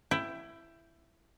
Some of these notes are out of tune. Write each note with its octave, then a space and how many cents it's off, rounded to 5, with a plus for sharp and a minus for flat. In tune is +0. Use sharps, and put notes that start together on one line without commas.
E4 +15 G5 +0